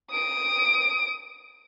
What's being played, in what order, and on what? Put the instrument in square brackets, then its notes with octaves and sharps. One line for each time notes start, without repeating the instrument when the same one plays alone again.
[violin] D#6 D7